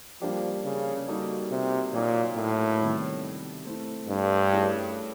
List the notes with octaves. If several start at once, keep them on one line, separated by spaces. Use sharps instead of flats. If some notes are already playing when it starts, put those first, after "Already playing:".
F3 G3 A#3 D4 G4
C#3
G3 A#3 D#4 F#4 A4
C3
A#2 F#3 A#3 D#4 F#4
A2
C3 D#3 G3 B3
A3 C4 E4
G2
A3 C#4 E4 G#4 B4